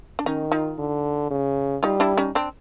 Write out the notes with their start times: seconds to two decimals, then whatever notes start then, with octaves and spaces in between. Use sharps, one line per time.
0.19 D4
0.26 D#3 C#4 D#4
0.52 D#4 F4
0.79 D3
1.30 C#3
1.83 G3 D#4 F4
2.00 D4 E4
2.18 C#4 D#4
2.35 C4 D4